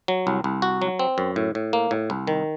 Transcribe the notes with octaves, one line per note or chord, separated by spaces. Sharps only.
F#3
C2
C2
F#4
F#3
C4
F#2
A2
A2
A#3
A2
C2
D#3